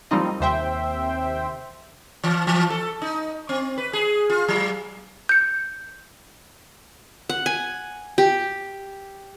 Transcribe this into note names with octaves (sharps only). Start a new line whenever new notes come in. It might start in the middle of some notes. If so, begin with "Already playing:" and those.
F3 G3 A#3 C4 D#4 D#5
D#2 C3 C5 E5 G5
E3
E3
A4
D#4
C4
B4
G#4
F4
F#3
G6 C#7
F#5
G#5
G4